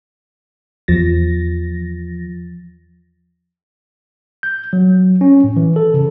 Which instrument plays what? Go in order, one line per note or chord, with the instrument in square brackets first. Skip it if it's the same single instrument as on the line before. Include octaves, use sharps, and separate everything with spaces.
[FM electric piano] E2 F3 A6 A#6
[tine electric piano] G6
F#3
C#4
A2
E3
A4
C#3